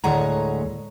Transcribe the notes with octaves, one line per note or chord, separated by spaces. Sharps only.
D2 A2 G#3 C#5 F#5 A#5